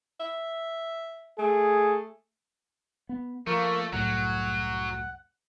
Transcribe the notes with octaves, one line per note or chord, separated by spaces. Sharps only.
E5
A3 G#4
B3
F3 A3 A#3 A#4 C#6
C2 F#2 A2 F#3 F#5